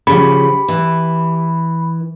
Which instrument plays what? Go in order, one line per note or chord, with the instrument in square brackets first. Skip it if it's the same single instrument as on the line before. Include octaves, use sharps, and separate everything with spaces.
[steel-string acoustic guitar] C#3 F3 [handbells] G4 [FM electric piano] B5
[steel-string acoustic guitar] E3